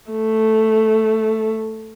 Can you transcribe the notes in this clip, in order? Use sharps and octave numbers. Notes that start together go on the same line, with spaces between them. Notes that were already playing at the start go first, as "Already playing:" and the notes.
A3